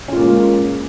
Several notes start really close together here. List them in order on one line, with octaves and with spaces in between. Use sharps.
C#4 F4 A#3 G#3